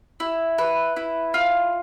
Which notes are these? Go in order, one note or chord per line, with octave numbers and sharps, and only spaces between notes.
E4
B4
E4
F4